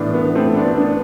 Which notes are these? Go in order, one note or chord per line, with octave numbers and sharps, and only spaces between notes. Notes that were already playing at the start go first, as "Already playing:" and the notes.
Already playing: A2 E3 B3 D4
B3
A3 C4
B3 D4
B3 D4